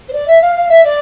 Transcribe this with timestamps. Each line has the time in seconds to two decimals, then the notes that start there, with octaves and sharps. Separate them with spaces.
0.08 C5
0.13 D5
0.27 E5
0.41 F5
0.56 F5
0.69 E5
0.84 D5